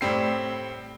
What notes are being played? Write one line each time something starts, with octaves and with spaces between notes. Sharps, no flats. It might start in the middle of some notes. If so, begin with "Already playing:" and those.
A2 G3 C4 C7